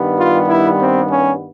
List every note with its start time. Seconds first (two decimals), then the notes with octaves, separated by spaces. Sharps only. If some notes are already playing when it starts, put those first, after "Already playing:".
Already playing: G2 D#3 G3 B3
0.17 F4
0.48 E4
0.79 C4
1.09 C#4